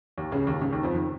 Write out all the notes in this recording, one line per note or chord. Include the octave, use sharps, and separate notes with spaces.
D#2 D#3
C#2 C#3
D#2 D#3
C#2 C#3
D#2 D#3
F2 F3
D#3